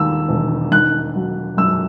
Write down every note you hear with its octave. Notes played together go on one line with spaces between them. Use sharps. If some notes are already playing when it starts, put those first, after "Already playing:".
Already playing: D#2 E6
E1
D#3 F#6
F#3
F#2 E6